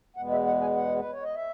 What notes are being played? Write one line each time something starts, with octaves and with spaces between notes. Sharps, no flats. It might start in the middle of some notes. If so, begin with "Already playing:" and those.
E2 B2 G#3 B3 F#5
E5
F#5
G#5
F#5
B4
C#5
D#5
E5